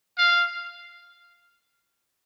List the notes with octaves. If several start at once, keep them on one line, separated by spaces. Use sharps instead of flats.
F5